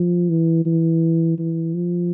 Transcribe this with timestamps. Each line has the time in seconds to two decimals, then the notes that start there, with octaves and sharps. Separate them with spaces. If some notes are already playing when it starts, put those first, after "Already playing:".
Already playing: F3
0.29 E3
0.66 E3
1.39 E3
1.74 F3